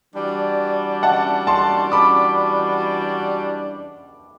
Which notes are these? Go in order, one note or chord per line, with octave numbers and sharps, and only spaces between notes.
E3 G3 D4 F#4
F#5 A5
A5 C6
B5 D6